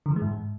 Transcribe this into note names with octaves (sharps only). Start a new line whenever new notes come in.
D3
E3
G#3
G#2